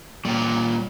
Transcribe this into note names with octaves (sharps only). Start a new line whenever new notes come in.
A#2 G3 A#3 C#5